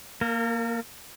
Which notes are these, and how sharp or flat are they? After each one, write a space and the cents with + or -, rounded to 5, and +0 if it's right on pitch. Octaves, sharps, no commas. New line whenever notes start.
A#3 -5 A#4 -40